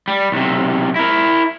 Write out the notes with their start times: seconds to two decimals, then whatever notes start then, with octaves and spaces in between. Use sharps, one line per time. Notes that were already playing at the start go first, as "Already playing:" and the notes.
0.08 G3
0.32 B1 C3
0.96 E4 A#4